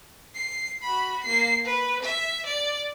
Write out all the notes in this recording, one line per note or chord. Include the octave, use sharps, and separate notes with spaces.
C7
F#4 B5
A#3 C7
B4
E5
D5